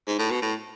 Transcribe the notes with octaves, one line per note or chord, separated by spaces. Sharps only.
G#2
A2
B2
A2